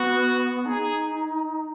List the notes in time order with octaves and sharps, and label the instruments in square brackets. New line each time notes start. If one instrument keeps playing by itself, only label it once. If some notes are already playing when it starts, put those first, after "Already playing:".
Already playing: [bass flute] B3 [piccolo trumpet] F#4
[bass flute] D#4 [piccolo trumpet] G#4